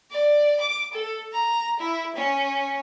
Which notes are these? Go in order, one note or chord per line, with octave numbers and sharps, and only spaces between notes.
D5
D6
A4
A#5
E4
C#4